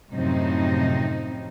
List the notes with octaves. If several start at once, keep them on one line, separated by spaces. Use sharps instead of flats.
F#2 A2 C3 F3 C4 D#4